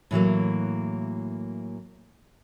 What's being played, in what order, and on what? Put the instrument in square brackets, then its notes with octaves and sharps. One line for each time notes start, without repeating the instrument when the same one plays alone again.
[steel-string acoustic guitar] A2 E3 F#3 A#3